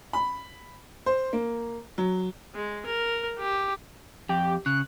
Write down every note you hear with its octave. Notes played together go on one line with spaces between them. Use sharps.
B5
C5
A#3
F#3
G#3
A#4
G4
F2 G4
C#3 F#6